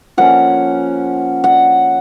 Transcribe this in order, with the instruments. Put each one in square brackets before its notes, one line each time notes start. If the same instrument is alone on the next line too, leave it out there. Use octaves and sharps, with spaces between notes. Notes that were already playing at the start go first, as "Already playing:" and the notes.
[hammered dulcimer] F3 A#3 C#4 F#5
F#5